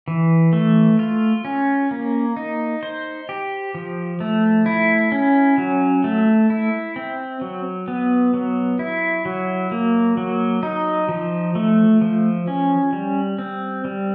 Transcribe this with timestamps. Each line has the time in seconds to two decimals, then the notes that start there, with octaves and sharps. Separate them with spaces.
0.08 E3
0.53 A3
0.99 F4
1.45 C#4
1.91 A#3
2.36 D#4
2.83 C5
3.29 G4
3.74 F3
4.20 A3
4.66 E4
5.12 C#4
5.58 F#3
6.04 A3
6.50 E4
6.96 C4
7.41 F#3
7.88 B3
8.34 F#3
8.79 E4
9.25 F#3
9.71 A#3
10.17 F#3
10.63 D#4
11.09 F3
11.55 A3
12.01 F3
12.47 C#4
12.93 G3
13.39 C4
13.85 G3